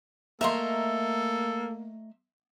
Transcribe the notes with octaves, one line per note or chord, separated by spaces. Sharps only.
A3 A#3 A4 D#5 E5 A#5 C6